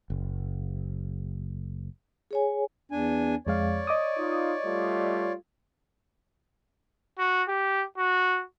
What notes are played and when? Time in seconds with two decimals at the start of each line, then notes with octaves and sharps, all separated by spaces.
0.10 F#1
2.31 G#4 C#5 G#5
2.91 E2 D4 G#5
3.47 F2 G#3 C#5 D5 F5
3.87 D#5 D6 D#6
4.18 D#4 F4
4.64 G3 A3 F4
7.18 F#4
7.48 G4
7.98 F#4